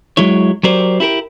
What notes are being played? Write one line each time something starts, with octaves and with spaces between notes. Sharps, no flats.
F#3 G#3 E4 C#5
F#3 G4 A#4 C5 D5
E4 G4 A4 A#4